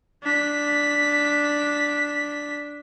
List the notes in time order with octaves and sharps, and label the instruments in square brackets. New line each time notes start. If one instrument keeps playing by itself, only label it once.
[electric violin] D4 B6